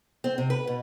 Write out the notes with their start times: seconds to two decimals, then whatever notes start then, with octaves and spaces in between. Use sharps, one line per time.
0.24 C4
0.38 C3
0.50 B4
0.67 B2